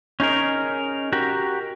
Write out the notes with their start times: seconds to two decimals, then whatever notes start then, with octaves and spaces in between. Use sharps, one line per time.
0.20 C#4 D#4 G#4 A#4
1.13 F#4 G4 A#4